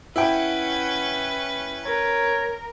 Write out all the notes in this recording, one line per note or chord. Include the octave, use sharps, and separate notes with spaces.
C#4 E4 B4 F#5 G5
A#4 C#5